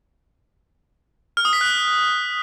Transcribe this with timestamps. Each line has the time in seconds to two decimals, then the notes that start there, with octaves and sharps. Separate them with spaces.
1.37 F6
1.45 D#6
1.53 B6
1.61 F#6